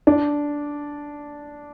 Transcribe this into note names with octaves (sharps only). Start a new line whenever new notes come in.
D4